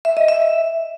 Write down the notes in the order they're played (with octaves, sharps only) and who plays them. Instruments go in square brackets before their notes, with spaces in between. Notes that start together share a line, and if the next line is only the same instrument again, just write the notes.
[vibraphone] E5
D#5
E5